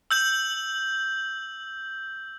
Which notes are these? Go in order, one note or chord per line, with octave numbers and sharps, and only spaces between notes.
E6 G6 F#7